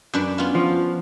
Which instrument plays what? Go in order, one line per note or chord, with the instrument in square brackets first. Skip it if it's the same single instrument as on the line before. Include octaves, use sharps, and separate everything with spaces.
[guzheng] F#2 D4 B4
B3 C#4 F4
[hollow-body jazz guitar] F3